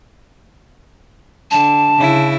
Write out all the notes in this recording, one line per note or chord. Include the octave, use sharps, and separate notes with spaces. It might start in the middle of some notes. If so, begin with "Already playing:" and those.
D3 A5
C#3 E4